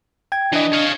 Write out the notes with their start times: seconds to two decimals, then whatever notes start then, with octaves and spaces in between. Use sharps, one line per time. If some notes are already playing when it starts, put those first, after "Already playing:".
0.32 G5 G#6
0.53 E3 D4 D#5
0.73 C#5 F5